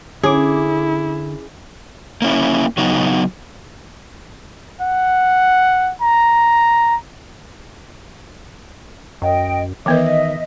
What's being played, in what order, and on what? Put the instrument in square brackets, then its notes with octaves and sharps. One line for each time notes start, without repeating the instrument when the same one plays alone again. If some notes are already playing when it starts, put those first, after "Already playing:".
[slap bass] D3 [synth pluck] C#4 D6 [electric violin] E4 [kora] G#4
[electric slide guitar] A#3 C#4 E4
C#3 F#3 B3 D#4
[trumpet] F#5
A#5
[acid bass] F#2 [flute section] D#5 G5
[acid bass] D#3 [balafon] E3 B3 B4 [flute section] D#5 E5